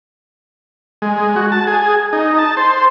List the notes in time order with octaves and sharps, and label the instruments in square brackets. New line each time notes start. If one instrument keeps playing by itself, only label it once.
[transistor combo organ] G#3
F#4
A5
G#4
D#4
A5
C5